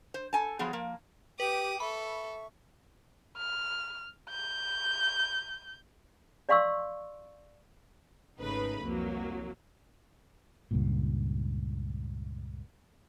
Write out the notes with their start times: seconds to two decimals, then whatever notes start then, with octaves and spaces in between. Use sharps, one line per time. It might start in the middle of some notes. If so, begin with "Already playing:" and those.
0.14 C5
0.33 A4 G#5 A5
0.59 F3 F#3 B3 G#4
0.73 F3 A#3
1.40 G4 B4 G5 D6 D#6
1.80 A4 E5 B5 C#6
3.37 F6
4.30 G6
6.49 D5 D#5 F5 C6 C#6 E6
8.40 G#1 C#3 A3 D#4 B4 B5
8.83 C2 F2 F#3 A#3
10.71 C#2 G2 A#2